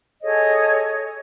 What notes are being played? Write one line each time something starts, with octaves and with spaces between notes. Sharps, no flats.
G#4 A4 C#5 D#5